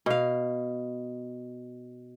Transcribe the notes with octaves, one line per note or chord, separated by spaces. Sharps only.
B2 F5